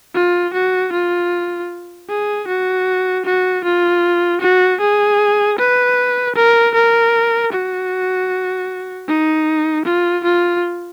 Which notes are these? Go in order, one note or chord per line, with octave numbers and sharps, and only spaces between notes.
F4
F#4
F4
G#4
F#4
F#4
F4
F#4
G#4
B4
A#4
A#4
F#4
D#4
F4
F4